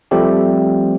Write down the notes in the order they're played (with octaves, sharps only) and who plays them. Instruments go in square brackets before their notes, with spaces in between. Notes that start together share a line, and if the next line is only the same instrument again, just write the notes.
[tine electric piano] F3 G3 A3 C4 G4